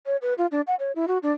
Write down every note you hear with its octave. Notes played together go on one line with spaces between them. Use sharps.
C#5
B4
F4
D4
F#5
C#5
E4
F#4
D4